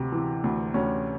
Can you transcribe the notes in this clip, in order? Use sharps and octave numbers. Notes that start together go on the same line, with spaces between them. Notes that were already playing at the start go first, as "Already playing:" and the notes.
Already playing: D2 C3
E3
D2
D2 C#4